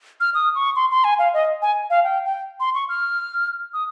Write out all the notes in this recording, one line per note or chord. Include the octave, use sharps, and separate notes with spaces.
F6
D#6
C#6
C6
C6
G#5
F5
D#5
G#5
F5
G5
G5
C6
C#6
F6
D#6